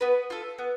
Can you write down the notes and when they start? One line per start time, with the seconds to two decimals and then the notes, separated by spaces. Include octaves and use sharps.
0.01 B3 B4
0.30 F4 A4
0.58 B3